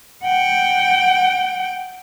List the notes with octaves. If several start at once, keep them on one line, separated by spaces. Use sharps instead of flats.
F#5 G5